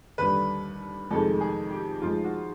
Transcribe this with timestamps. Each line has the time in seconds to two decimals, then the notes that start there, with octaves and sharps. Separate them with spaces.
0.18 D#2 D3 G3 B4
1.11 F2 C3 D#3 G#3 A4
1.40 G#4
1.70 G4
2.02 G#2 F3 G#3 F4
2.24 F#4